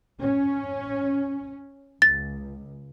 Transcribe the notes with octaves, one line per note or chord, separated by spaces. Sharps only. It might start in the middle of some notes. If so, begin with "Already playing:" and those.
C#4
C#2 A6